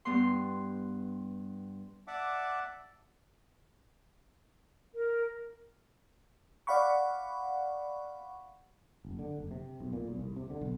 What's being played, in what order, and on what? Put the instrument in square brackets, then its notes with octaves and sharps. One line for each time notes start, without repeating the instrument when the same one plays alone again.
[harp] G2 B3 C6
[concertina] D5 E5 F#5 A5 D6
[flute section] A#4
[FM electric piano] D5 F5 F#5 B5 C#6
[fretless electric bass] F#1
D3
F#1
C3
B1
A#2
B1
C2
C3
D3
B1